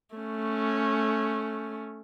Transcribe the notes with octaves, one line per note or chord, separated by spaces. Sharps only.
A3 C#4